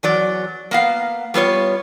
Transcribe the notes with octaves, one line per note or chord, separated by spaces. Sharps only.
E2 F#3 D5
A#3 B3 F5
G3 B3 F4 C#5